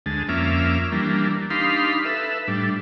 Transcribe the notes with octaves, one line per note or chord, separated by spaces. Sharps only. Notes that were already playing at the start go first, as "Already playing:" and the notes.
D2 G#3 A5
F2 A#3 C#4 E5 D6 F6
E3 G3 A#3 D4
D4 D#4 G4 F5 B5 C6
A4 B4 E5
A2 G3 D4